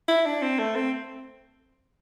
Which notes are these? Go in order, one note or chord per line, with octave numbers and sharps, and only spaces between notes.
E4
D4
C4
A3
C4